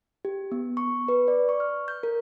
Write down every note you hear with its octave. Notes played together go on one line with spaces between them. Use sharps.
G4
B3
C#6
B4
D5
C#6
F6
G6
A#4